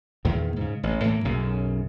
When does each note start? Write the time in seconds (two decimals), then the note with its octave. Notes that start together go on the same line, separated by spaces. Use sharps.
0.25 E2 A#2 D#3
0.56 G#2 C#3
0.83 A1
1.04 A2 E3 G#3 A#3
1.25 B1 F#2 C#3